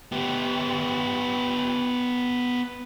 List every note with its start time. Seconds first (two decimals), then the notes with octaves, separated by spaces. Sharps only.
0.12 B3 G4